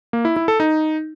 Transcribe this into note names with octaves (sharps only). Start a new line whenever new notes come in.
A#3
E4
E4
A4
D#4